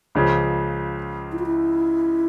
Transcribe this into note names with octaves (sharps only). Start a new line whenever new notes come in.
C#2 C#3 F3
E4
F4
E4